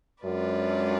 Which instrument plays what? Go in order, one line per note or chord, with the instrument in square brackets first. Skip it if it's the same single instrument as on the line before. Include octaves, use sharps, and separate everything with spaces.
[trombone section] F#2 [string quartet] G#3 D4 F4 B4 D5